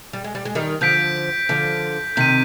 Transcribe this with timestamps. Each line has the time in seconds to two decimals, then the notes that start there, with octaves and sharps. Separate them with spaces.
0.13 G3
0.24 G#3
0.35 G3
0.45 G#3
0.55 D#3 G3
0.81 D3 F3 G6 B6 D7
1.49 D3 F3
2.16 C3 D#3 G6 B6 D#7